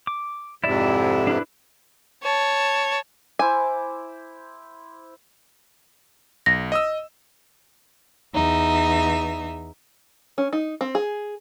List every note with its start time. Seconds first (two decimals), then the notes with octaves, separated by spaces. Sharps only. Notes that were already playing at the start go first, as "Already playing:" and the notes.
0.07 D6
0.64 F2 G#2 C3 E4 D5 E5
1.27 D4 E4 B4
2.23 C#5 A5
3.39 E4 C5 G#5 D6
6.46 B1 A#6
6.72 D#5 D#6 E6
8.34 E2 D#4 E5
10.38 C#4
10.53 D#4
10.81 C4
10.95 G#4